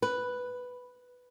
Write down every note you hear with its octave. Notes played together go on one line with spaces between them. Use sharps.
B4